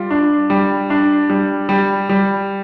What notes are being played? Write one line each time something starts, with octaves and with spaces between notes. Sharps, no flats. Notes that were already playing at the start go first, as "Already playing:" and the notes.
Already playing: G3 F4
D4
G3
D4
G3
G3
G3